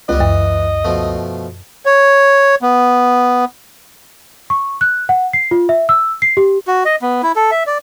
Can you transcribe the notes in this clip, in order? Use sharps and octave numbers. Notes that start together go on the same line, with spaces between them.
C#2 G3 B3 D#5
F#2 E3
B2 F3 A3
C#5
B3
C#6
F#6
F#5
C7
F4
E5
E6
C7
G4
F#4
D#5
B3
E4
A4
E5
D5